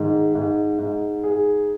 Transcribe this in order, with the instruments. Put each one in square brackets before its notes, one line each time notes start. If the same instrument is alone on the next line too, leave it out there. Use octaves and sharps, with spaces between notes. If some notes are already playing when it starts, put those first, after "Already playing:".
Already playing: [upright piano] G#2 D#3
G#2
G#2
G#4